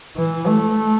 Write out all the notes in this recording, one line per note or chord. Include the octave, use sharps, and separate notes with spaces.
E3
A3